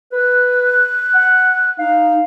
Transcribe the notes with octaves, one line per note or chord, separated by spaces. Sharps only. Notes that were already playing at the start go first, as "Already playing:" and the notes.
B4 F#6
F#5
D#4 F5